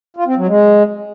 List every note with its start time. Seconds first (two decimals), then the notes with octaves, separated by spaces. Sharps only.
0.17 F4
0.27 C4
0.37 F#3
0.48 G#3